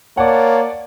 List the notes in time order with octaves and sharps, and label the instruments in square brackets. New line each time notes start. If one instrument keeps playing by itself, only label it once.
[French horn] A#3 [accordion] C#5 A5 [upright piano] D5 F#5